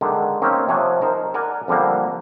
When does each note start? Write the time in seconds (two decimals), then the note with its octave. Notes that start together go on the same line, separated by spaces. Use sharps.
0.01 D3 D#3 G#3
0.42 A#3 C4 C#4 D#4
0.68 C3 F3 C#5 F#5 G#5
1.02 D#4 A#4 C5
1.34 A#4 D5 F#5 G#5
1.68 F2 D3 G3 A#3